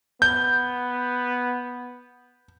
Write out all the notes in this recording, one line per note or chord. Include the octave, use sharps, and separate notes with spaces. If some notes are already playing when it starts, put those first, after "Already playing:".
B3 G6